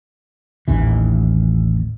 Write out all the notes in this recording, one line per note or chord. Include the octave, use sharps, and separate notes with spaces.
A1 D#2 E3